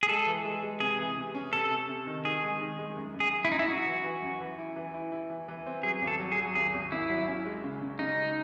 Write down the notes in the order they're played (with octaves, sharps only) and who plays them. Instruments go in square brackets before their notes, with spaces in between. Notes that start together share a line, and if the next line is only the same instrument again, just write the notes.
[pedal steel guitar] G#4
[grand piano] G#3 [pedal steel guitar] A4
[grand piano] E3
G#3
G#3
[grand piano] C3 [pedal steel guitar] G#4
[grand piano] E3
C3
C#4
[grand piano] C3 [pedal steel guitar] A4
[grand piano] C3
C3
D#3
[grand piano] D#3 [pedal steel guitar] G#4
[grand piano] G#3
D#3
G#3
F#2
F#2
[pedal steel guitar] G#4
[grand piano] F#2
[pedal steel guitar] E4
[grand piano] F#2 [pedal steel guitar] D#4
[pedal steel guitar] E4
[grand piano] F#2 [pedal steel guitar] F#4
[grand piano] E3
E3
F#2
E3
E4
E3
E4
E4
E3
E3
C4
[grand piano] F#3 [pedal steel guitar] G#4
[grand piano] G#1
[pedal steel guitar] A4
[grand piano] F#3
[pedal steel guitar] G#4
[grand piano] F#3
[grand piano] G#1 [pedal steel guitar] G#4
[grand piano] G#1
[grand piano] G#1 [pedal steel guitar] E4
[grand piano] F#3
C#4
G#3
C#3
C#3
[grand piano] C#3 [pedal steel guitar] D#4
[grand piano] G#3